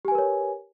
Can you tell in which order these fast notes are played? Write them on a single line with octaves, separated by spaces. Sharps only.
G4 G#5 B4 A#4 C#5